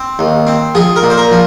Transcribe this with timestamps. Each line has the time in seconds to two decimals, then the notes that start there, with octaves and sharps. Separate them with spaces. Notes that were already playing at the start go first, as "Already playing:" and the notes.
Already playing: C4
0.19 D#2
0.47 C4
0.75 F3 G#4
0.96 A#4
1.03 A#2
1.10 C5
1.17 A#4
1.31 F3